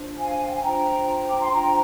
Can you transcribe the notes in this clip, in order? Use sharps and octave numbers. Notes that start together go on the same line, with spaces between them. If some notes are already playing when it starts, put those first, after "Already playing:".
Already playing: D4 F4 C5
F5 G#5
F5
G5
G#5
D4 F4 C5 G5 A#5
D6
C6
D4 F4 C5 G5 A#5